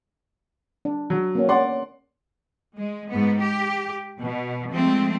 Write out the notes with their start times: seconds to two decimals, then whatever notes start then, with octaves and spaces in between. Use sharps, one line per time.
0.85 D4
1.10 F#3
1.35 A#3 B3 C#4
1.49 C#4 D5 F#5 C6
2.76 G#3
3.10 G#2 B3
3.39 G4
4.22 B2
4.72 F3 G#3 A3 C4